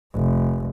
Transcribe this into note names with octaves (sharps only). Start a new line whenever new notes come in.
F1